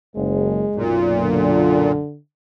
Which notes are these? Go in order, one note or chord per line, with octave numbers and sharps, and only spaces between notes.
F#1 G#3
B1 F#2 A#2
D3